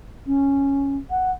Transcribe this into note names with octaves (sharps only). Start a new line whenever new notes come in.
C#4
F#5